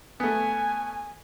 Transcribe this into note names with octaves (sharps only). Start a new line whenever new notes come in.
A3 B3 G#5